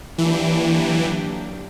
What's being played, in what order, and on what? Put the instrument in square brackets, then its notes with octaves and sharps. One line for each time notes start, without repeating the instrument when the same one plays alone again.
[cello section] D3 F#3 A#3 D4 G4 [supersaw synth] E3